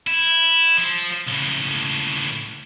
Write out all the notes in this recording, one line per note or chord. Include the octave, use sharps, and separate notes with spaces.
E4
F3
C#2 A2